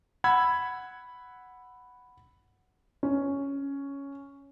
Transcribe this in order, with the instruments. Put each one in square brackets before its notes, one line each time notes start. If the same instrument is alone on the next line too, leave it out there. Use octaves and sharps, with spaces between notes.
[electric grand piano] F#5 B5 E6 G#6
[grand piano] C#4